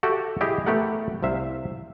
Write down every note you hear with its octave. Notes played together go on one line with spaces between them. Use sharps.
F#4 G4 A4 E5 G5
E4 G4 G#4 D#5
A3 B3 G4 A4 A#4 F#5
C2 C3 E5 F5